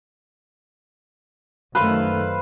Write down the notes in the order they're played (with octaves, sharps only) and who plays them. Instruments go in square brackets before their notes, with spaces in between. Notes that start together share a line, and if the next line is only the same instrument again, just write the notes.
[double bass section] F#2 D#3 A3 [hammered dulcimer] B4 C5 F5